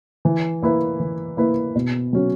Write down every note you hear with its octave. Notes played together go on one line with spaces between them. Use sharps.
E3
A#3 E4 B4
E3
A#3 E4 B4
B2
F#3 C#4 F#4